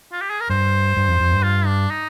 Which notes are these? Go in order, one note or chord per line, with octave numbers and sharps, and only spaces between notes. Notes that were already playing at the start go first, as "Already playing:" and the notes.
F4
G4
G#4
A#4
G2 C5
G2
F2
F2
G2
F4
D4
D#4